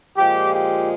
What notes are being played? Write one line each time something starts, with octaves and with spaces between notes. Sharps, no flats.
A#2 F3 G#3 G4
G4